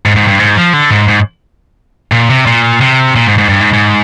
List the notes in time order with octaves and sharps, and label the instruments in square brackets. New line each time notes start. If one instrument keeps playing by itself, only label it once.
[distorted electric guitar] G#2
G#2
G2
G#2
F3
D3
G#2
G#2
A#2
C3
A#2
C3
A#2
G#2
G#2
G2
G#2
G#2